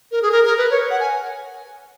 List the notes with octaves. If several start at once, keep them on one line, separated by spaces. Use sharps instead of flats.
A#4
G#4
A#4
A#4
B4
C#5
F#5
G#5